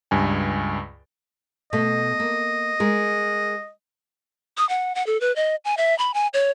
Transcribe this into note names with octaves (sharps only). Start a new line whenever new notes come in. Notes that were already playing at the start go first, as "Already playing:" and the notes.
C#2 G2 G#5
B2 A3 D#5
A#3
G#3 A#4
D#6
F#5
F#5
A4
B4
D#5
G#5
E5
B5
G#5
C#5